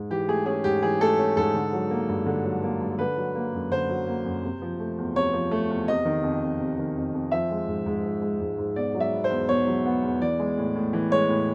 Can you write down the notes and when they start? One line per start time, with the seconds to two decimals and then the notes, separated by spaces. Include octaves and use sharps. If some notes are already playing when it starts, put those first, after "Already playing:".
Already playing: G#2
0.10 E3 G4
0.28 A3 G#4
0.46 C#4 G#4
0.64 G#2 G4
0.83 E3 G#4
1.00 A3 A4
1.19 C#4
1.37 G#2 A4
1.54 D3
1.73 F#3
1.90 A#3
2.08 G2
2.26 D3
2.45 F#3
2.63 A#3
2.81 G2
2.99 D3 B4
3.17 F#3
3.35 A#3
3.54 F#2
3.71 D3 C5
3.89 F#3
4.07 A#3
4.25 F#2
4.43 C3
4.62 F3
4.79 A3
4.98 E2
5.15 C3 C#5
5.33 F3
5.51 A3
5.70 E2
5.88 C3 D#5
6.05 D#3
6.23 F2
6.42 F2
6.60 C3
6.78 D#3
6.97 F2
7.13 F2
7.32 F3 E5
7.51 G#3
7.68 G#2
7.86 G#2
8.04 F3
8.22 G#3
8.41 G#2
8.58 G#2
8.76 B2 D5
8.95 F#3
9.00 E5
9.12 B3
9.24 C5
9.30 E2
9.48 B2 C#5
9.67 F#3
9.85 B3
10.03 E2
10.21 E3 D5
10.40 G#3
10.58 A2
10.75 A2
10.93 E3
11.11 G#3 C#5
11.29 A2